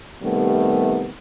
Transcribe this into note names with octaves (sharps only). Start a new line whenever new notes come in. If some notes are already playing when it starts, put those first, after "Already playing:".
C3 D#3 G3 A3 B3